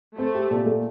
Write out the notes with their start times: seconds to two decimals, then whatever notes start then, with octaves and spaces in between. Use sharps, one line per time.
0.17 A3 C4
0.35 G4
0.51 A#2
0.66 A3